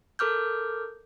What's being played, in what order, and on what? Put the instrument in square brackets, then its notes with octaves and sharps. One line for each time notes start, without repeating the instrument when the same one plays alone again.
[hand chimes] A4 A#4 D6 F6 G6